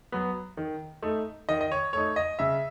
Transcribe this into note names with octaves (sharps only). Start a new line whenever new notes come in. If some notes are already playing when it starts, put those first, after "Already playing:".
F#3 B3
D#3
A3 D#4
D#3 D#5
D#5
C#5
A3 D#4 C#5
D#5
C#3 E5